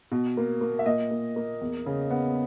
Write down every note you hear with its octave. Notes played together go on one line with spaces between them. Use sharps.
B2
A#3
A#3
E5
A#2 D#5
A#3
A#3
E2
C#3
B3